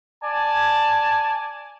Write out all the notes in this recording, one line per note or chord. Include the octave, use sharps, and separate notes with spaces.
D5 G#5 A5